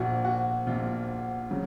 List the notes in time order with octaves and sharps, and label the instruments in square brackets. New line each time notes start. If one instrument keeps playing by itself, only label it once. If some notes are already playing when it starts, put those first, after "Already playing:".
Already playing: [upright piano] A#1 A#2 F3 F#4
F#4
A#1 A#2 F3 F4
C#3 F#3